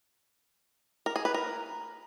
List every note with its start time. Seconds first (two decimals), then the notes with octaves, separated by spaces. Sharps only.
1.06 A#4
1.16 G#4
1.25 B4
1.34 A#4